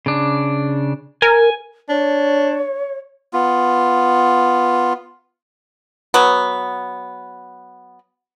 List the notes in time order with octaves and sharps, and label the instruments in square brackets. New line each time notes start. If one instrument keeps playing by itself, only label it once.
[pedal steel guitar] C#3 D4
[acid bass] A#4 [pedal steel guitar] G#5
[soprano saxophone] D4 [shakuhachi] C#5
[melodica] B3 F4
[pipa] F#3 B3